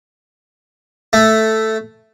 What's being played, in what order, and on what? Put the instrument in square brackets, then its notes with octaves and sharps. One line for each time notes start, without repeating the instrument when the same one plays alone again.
[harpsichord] A3